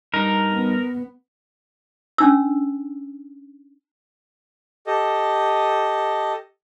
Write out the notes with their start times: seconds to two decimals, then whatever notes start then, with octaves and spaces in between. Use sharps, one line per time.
0.14 G2 D#4 A#4
0.53 B3
2.18 C#4 D4 E6
4.87 G4 A4 D#5